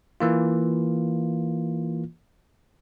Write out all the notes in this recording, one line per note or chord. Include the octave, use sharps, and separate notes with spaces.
E3 A#3 F4